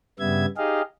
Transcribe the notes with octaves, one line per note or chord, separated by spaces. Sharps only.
G2 C#3 G3 B3 E5 G#6
D#4 G4 G#4 D#5 F5